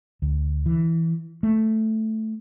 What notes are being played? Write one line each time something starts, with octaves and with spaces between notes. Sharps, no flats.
D2
E3
A3